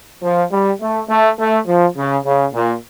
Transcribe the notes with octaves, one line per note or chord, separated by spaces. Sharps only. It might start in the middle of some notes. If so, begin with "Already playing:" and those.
F3
G3
A3
A3
A3
F3
C#3
C#3
A#2